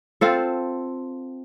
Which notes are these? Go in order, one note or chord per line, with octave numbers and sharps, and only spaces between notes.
C4 F4 A4